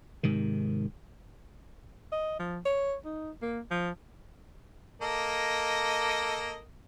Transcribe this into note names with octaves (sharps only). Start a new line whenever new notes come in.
G#2 C3 D#3
D#5
F3
C#5
D#4
A#3
F3
A#3 A4 D#5